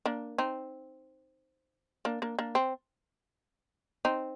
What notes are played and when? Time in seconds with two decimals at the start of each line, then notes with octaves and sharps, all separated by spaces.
0.06 A#3 D4
0.38 C4 D#4
2.05 A#3 D4
2.22 A#3 D4
2.39 A#3 D4
2.55 C4
4.05 C4 D#4